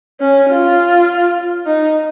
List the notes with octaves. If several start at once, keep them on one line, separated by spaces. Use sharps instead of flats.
C#4
F4
D#4